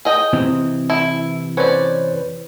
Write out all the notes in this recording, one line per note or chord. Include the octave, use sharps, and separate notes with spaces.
G#4 D#5 G5
C3 E3 C4
E4
C#4 B4 C5 D5